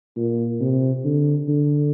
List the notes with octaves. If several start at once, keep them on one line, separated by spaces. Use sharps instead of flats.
A#2
C3
D3
D3